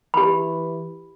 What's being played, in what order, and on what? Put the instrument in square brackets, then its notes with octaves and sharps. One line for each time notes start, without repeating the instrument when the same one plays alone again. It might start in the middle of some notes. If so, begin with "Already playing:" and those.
[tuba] E3 [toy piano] G4 B5